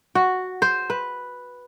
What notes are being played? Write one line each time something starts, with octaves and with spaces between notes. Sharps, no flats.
F#4
C5
B4